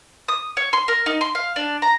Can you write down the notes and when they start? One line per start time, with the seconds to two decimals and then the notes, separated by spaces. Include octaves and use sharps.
0.28 D#6
0.57 C#5
0.73 C6
0.88 A#4
1.06 D#4
1.21 C6
1.35 F5
1.56 D4
1.82 A#5